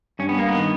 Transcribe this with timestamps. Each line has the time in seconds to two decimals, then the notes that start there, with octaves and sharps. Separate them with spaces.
0.19 G2 C#4
0.29 B3
0.39 A#3
0.48 B3
0.54 D#3